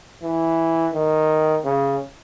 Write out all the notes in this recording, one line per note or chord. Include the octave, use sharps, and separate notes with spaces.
E3
D#3
C#3